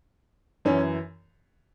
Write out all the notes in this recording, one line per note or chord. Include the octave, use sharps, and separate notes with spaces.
F#2 E3 C#4